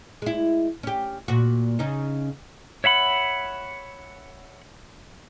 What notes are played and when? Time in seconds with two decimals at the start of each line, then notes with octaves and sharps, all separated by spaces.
0.22 G#3 E4
0.83 C#4 G4
1.28 A#2 F#4
1.79 C#3 C#4 D#4
2.84 C#5 E5 F#5 B5